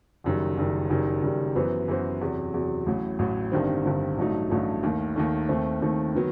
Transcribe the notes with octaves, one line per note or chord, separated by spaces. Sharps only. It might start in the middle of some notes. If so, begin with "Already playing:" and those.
F#1 F#2 D#3 G3
F#1 F#2 D#3 G3
F#1 F#2 D#3 G3
F#1 F#2 D#3 G3
F#2 E3 B3 F#4 C5
F#2 E3 B3 F#4 C5
E2 C3 F#3
E2 C3 F#3
A1 A2 F#3
A1 A2 F#3
G1 G2 D#3 G3 C4
G1 G2 D#3 G3 C4
A1 G2 F#3 A3 D#4
A1 G2 F#3 A3 D#4
D#2 D#3 A3
D#2 D#3 A3
D#2 D#3 A3 C4
D#2 D#3 A3 C4
D#3 F#3 B3